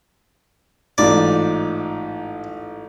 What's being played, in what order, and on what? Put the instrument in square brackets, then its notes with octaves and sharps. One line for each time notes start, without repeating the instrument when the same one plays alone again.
[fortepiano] A1 G#2 F4 [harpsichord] D5